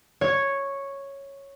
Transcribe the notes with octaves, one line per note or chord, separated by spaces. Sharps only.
C#5